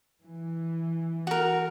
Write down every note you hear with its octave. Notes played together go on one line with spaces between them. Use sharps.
E3
F#4 A#4